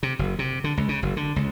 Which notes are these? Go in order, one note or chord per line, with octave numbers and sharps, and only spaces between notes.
C3
F#1
C3
D3
C#2
C#3
F#1
D3
C#2